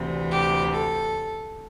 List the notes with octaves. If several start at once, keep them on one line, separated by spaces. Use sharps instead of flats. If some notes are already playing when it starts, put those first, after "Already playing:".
Already playing: D2 C3 E3
G4
A4